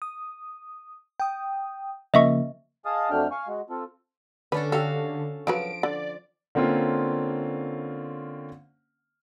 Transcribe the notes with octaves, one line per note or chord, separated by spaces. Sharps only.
D#6
G5 D#6
C#3 F3 A#3 D#5 E5 C#6
G#4 D#5 F5 A5 D#6
F2 F#3 A3 D4 G5 F6
F5 G#5 C#6
G#3 F#4
C4 F4 A4
D3 C#4 D4 A4 B4
F#4 G4 A4 F5
C#3 F3 F#3 B4 D7
D3 D5
D3 A#3 C4 C#4 F4